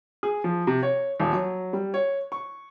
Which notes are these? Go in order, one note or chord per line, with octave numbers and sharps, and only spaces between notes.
G#4
F3
C3
C#5
D#1
F#3
G3
C#5
C#6